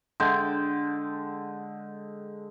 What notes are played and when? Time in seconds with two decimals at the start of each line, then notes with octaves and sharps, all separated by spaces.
0.20 D3 G#3 G5 A5